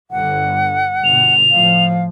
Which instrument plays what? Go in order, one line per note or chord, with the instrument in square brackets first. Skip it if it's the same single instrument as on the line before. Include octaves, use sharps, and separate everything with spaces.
[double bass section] G1 D3 [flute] F#5
[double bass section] G1 B2 [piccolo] F7
[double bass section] A2 F3 [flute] F5